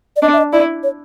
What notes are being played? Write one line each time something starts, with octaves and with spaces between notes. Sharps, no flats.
D5
D4 D#5
E5
D#5
E4 D5
C#5